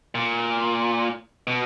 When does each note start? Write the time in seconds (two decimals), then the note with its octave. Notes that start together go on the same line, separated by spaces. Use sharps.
0.15 A#2
1.47 B2